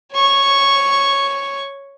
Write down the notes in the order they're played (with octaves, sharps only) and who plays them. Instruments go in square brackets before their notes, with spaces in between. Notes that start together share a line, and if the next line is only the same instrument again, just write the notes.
[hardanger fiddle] C#5 C#6